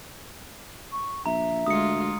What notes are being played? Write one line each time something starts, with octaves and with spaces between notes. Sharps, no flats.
C#6
A#1 E5 A#5
D2 G#3 F4 D#6 C#7